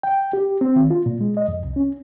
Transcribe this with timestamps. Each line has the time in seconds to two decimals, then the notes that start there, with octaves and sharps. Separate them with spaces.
0.03 G5
0.33 G4
0.61 C4
0.76 D#3
0.90 F4
1.06 A#2
1.21 G#3
1.37 D#5
1.48 F2
1.64 C2
1.76 C#4